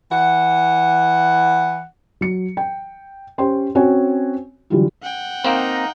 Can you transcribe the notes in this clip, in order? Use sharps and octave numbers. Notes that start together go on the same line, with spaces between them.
E3 F#5
F#3 C#7
G5
C#4 G4 C5 C#5 G5 C6
C4 C#4 F#4 C#5 G#5
D3 E3 F#3 G3 F4 G4
F#5 G5
A#3 C4 D#4 F5 A#5